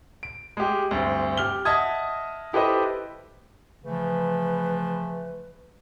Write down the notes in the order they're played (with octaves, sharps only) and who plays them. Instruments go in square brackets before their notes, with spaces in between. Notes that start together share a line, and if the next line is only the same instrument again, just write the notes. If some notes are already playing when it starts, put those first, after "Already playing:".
[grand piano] D7
G#3 G4
D2 G2 C4
G4 F6 G7
D#5 E5 F#5 A5 D#6 G#6
E4 G4 A4 B4 C5 D#5
[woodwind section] C#3 E3 F3 A3 B4